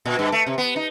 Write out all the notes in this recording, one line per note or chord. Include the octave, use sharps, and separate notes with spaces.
A#2
G2
A3
C3
B3
D#4